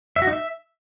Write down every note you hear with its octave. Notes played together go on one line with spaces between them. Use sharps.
E5
F#4
D#4
E5